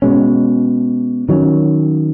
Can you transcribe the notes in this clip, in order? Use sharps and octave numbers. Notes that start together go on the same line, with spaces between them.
B2 G#3 C#4
D#3 F#3 C#4